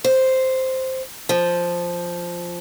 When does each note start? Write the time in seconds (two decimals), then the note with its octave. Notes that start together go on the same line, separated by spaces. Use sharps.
0.04 C5
1.29 F3